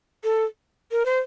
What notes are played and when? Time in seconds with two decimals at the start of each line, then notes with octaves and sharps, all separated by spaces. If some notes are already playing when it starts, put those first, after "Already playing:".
0.24 A4
0.92 A#4
1.05 C5